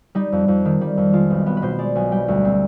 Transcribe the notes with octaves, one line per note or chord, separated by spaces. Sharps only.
G3 D#4
F2
F2
D#3
G3
F2
G#3 F4
B1
B3
B4
B2 C5
G#3 D5
B1 G#5
G3 G5
D2
C4